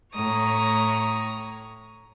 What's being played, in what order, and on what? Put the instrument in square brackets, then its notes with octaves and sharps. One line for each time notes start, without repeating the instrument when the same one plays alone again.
[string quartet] A2 C#5 A#5 D#6